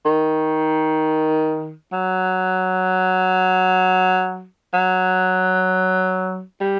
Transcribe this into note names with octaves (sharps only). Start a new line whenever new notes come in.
D#3
F#3
F#3
G3